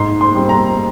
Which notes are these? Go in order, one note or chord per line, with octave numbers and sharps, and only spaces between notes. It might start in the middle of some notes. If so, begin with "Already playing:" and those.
Already playing: G#2 C6
C6
G3 C4
A#5